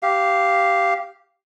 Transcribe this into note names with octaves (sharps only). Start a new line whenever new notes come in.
G4 F5